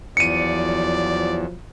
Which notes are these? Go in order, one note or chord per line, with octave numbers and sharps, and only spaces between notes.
E2 F3 F#3 D5 C#7 D#7